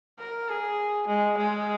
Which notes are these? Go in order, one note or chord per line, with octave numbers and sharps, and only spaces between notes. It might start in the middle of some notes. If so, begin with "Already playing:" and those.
A#4
G#4
G#3
G#3